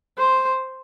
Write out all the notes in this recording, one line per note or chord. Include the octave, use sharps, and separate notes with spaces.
C5